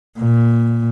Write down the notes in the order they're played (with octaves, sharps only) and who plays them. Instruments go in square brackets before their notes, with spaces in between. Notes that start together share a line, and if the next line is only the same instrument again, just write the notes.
[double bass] A#2